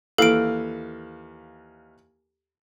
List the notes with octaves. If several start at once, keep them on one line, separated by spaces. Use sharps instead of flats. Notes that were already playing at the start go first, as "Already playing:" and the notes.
D#2 E3 A4 F5 D7